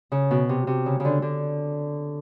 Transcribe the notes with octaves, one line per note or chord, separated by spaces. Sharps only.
C#3
B2
C3
C3
C#3
C#3
D3
D3